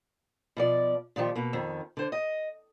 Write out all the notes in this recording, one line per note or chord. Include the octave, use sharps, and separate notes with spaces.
B2 F3 D5
A#2 D#3 F3 G4
B2 A#3
F2 D#3
D3 C5
D#5